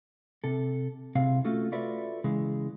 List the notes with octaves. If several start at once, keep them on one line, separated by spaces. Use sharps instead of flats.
C3 A4
C2 C3 C4 G#4 F5
A3 C#4 F4 F#4 A4
F4 F#4 A4 B4 D5 E5
C#3 E3 G#3